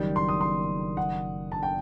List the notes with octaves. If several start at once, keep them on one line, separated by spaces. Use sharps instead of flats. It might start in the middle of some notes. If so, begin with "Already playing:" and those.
Already playing: F#1 F#2 D#3 G3
C6
D#6
C6
F#5
A5
G5